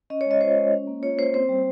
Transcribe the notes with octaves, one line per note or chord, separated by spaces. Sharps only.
C#4 D#5
C#5
G#3
D#5
F4 C5
G#3
C#4
A#3
F4 C#5
A#3 C5
C4 C5
G3